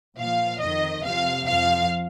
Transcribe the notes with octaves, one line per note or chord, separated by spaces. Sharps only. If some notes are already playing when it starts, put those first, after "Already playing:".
A#2 F3 F5
F2 D#3 D#5
F2 C3 F3 F5
F2 F3 F5